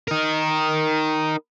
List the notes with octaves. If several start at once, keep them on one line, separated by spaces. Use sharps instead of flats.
D#4 A#4